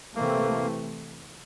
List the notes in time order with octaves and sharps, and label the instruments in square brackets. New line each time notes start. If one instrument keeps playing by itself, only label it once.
[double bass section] C3 E3 A3 C4 [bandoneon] A#3